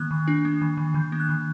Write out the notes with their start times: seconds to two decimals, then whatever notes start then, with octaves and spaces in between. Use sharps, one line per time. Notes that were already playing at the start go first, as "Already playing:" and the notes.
Already playing: D#3 A#3 F#6
0.11 D#3
0.28 D4
0.45 A#3
0.62 D#3
0.78 D#3
0.94 D#3 G6
1.12 A#3
1.20 F#6
1.29 D#3